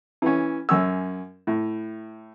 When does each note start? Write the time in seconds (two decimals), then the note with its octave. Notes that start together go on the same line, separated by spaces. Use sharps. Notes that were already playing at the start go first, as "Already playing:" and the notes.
0.22 E3 C#4
0.69 F#2 C#4 E6
1.47 A2